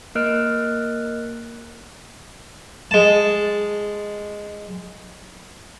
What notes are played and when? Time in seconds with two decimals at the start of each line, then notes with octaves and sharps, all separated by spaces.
0.15 A#3 A#4 D#5 F6 F#6 D7
2.91 G#3 A5